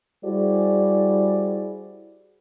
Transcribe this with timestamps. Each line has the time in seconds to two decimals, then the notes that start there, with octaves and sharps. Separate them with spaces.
0.24 G3 E4 F#4 G#4 C5 D5